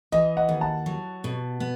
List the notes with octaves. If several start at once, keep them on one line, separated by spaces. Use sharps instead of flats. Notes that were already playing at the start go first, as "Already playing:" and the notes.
E3 D#5
D#5 F#5
D#2
F#5 A5
F#3
B2
B3